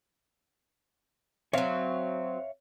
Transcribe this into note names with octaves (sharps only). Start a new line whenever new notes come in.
F#3 C4 C#5 E5 F5